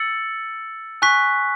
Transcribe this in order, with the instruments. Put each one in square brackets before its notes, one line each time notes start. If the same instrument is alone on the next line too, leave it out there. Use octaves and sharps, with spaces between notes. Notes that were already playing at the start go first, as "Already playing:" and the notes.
Already playing: [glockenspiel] E6 A6 C#7 F#7
G#5 C#6 F#6 B6